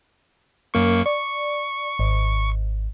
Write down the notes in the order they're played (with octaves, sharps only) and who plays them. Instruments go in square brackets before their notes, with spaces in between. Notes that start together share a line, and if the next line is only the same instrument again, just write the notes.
[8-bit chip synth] F#2 A#3 C#6
[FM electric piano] D5 [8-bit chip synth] C#6
[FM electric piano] G#1